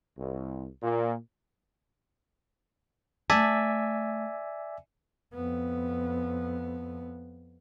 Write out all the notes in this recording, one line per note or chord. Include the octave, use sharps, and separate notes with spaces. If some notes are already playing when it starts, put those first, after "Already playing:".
C2
A#2
A3 D5 E5 G#5 A5
F2 B3